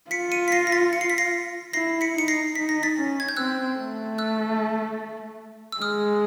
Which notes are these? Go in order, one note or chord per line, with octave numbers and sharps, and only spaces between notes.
F4 B6 C#7
C#7 D#7
B6
A#6 C7
A#6
A6 B6
C#7
C7
B6
A#6 C7
E4 A#6 C7
B6 C#7
D#4 C#7
A#6 C7
D#4 B6
A#6
A6 B6
C#4
G#6
G6
C4 E6 F#6
A3
E6 F#6
E6
G#3 D#6 F6